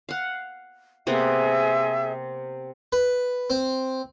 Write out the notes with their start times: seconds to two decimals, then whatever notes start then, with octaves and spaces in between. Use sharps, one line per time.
0.09 F5 F#5
1.07 C3 A#3 B3 G#4 E5
2.92 B4
3.50 C4